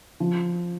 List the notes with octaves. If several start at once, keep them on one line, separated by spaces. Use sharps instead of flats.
F3